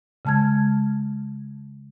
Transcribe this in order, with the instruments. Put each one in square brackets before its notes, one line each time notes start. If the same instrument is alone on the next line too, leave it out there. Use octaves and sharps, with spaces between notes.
[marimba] C#3 G#3 A5 F6 G#6